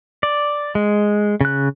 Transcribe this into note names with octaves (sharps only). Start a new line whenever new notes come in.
D5
G#3
C#3 F#6